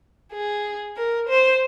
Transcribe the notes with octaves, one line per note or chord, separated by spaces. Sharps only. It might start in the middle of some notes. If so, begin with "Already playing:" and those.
G#4
A#4
C5